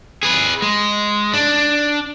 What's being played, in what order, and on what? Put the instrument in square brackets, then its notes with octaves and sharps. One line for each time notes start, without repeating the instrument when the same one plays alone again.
[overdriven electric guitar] G#4 B4
G#3
D4